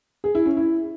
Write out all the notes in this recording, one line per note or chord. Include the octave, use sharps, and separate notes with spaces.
G#4
E4
C#4
E4